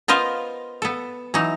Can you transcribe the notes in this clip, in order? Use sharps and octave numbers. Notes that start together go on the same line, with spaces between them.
B3 F4 A#4 C5 D#5 F5
B3 A4
E3 F#3 D#4